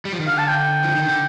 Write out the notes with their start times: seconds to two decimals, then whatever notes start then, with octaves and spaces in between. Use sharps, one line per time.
0.05 G3
0.13 F3
0.20 D#3
0.27 D3 F5
0.38 A5
0.48 G5
0.83 F3
0.95 D#3
1.09 D3